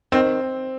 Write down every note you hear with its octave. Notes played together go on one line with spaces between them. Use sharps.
D#3 C4